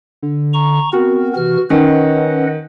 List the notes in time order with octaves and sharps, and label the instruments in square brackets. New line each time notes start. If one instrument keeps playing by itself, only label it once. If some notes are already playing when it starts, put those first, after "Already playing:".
[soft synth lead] D3
[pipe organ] A#5 C#6
[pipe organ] B3 C4 A#4 [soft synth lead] F#4
[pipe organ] C3 E3 F6
[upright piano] D#3 [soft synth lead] C#4 [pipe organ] B4 D#5 F#5